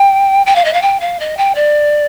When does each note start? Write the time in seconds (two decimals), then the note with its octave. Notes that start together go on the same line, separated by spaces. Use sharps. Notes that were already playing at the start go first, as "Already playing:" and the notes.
Already playing: G5
0.46 G5
0.55 F5
0.65 D#5
0.73 F5
0.82 G5
1.00 F5
1.20 D#5
1.37 G5
1.55 D5